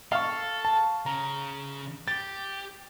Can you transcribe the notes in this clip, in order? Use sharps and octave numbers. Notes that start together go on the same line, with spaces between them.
A4 F5 C#6
A5
C#3 A#5
G4 A6